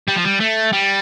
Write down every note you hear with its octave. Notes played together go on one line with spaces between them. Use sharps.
G3
F3
G3
A3
G3